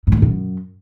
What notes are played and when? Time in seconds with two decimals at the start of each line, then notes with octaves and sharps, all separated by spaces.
0.07 G2
0.12 E2
0.17 A#2
0.22 F#2